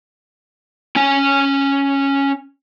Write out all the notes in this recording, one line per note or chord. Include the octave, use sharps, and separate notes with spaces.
C#4 G#5